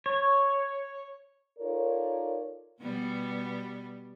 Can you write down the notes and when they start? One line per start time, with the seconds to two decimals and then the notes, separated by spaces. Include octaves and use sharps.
0.06 C#5
1.59 D#4 F4 A4 A#4 C#5 D5
2.81 B2 G3 B3